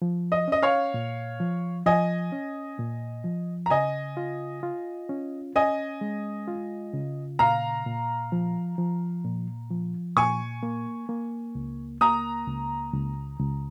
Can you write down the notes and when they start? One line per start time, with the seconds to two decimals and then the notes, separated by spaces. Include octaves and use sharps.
0.02 F3
0.32 D#5
0.48 C#4 D#5
0.62 C#5 F5
0.94 A#2
1.40 F3
1.86 F3 D#5 G#5
2.32 C#4
2.79 A#2
3.24 F3
3.66 A#5
3.70 C#3 D#5 G#5
4.17 F4
4.63 F4
5.09 C#4
5.56 C#4 D#5 G#5
6.01 G#3
6.48 F4
6.93 C#3
7.39 A#2 F5 A#5
7.86 A#2
8.32 F3
8.78 F3
9.24 A#2
9.71 F3
10.16 A#2 G#5 C#6
10.63 A#3
11.09 A#3
11.55 C#2
12.01 A#3 A#5 D#6
12.47 C#2
12.93 C#2
13.39 C#2